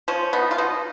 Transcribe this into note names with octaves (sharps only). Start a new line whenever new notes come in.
F3 C#4
B3 D#4
F4
B2 D#4